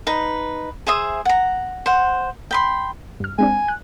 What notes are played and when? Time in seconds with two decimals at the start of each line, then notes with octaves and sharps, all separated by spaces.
0.07 D#4 B4
0.87 G#4 C5 E5 D#6
1.25 F#5 A#5
1.86 C5 F#5
2.51 G5 B5 C6
3.20 G2 F6
3.39 G#3 C4 D4 G#5
3.68 F#6